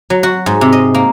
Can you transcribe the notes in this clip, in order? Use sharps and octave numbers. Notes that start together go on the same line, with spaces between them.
F#3
F#4
G#2
C3
D#5
A#3